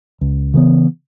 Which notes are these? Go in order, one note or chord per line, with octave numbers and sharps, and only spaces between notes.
C#2
C#3 E3 B3